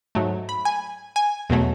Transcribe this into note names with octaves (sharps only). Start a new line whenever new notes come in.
G#2 F#3 A3
B5
G#5
G#5
E2 B2 F#3 A3